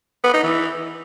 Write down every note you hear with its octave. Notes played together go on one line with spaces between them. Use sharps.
B3
D#4
E3